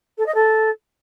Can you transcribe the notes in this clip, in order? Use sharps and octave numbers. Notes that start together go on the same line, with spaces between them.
A4
D#5
A4